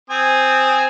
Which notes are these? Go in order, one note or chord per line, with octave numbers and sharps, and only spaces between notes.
C4 G#5 D#6